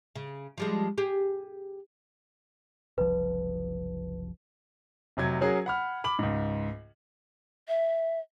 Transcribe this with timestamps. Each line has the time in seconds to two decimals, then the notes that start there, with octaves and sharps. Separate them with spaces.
0.16 C#3
0.58 F3 G3 G#3
0.98 G4 G#4
2.98 F#1 C2 F3 B4
5.17 F1 C3 F#3 G#6
5.41 F#3 C#4 F#4 G#4 A#4
5.66 F#5 B5 F6
6.04 B5 D6 F#7
6.19 C#2 G#2
7.68 E5